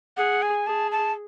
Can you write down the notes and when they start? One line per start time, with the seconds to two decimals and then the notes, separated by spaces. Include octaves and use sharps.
0.17 G#4 F#5
0.42 G#5
0.67 G#4 A5
0.92 A5